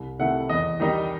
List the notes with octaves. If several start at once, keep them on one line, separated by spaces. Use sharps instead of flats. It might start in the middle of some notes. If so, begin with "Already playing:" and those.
Already playing: C2
C3 D#3 A3 E4 F#5
E2 D#5
D#3 G3 D#4